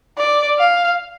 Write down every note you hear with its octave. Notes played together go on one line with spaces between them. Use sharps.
D5
F5